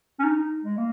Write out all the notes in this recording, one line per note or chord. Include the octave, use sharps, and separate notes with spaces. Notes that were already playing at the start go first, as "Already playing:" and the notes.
C#4
D#4
D#4
G#3
A#3